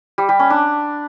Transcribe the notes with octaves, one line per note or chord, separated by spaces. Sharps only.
G3
G3
C#4
D4